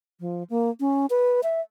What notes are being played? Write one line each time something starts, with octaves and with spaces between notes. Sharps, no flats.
F3
A#3
C#4
B4
E5